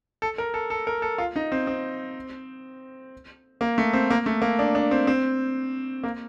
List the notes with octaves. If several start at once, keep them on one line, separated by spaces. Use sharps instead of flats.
A4
A#4
A4
A4
A#4
A4
F4
D#4
C4
C4
A#3
A3
C4
A#3
A3
A#3
D4
D4
C4
C4
A#3